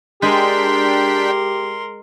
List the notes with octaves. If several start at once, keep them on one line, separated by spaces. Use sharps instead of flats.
G#3 D4 G4 A#4 G5 C6 B6